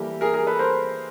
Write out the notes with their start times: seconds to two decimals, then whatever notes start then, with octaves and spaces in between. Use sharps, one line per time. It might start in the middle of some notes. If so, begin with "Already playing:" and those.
Already playing: E3 G3 A#3 G4 A4
0.21 G#4 A#4
0.34 G#4 A#4
0.47 A4 B4
0.59 A#4 C5